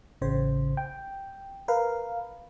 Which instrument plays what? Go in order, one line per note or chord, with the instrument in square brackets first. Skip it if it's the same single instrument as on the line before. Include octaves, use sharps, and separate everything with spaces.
[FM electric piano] A1 C#3 C5
G5
A#4 B4 F5